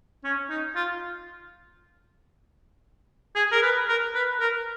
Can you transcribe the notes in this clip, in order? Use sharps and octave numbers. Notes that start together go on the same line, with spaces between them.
C#4
D#4
F4
G#4
A#4
B4
A#4
B4
A#4